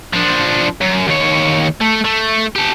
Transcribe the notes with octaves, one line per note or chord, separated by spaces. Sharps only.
F3 D4
F#2
D#2 C#5
A3
A3
G4 A4